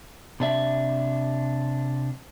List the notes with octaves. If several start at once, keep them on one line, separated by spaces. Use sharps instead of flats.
C3 D4 E5